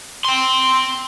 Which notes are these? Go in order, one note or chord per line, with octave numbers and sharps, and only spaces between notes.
G5 C6